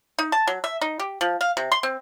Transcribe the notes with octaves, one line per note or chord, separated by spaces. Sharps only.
D#4
A5
F#3
E5
D#4
G4
F3
F5
C3
C6
C4